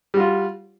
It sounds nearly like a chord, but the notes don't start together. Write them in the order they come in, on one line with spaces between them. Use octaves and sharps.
G3 F#4 F4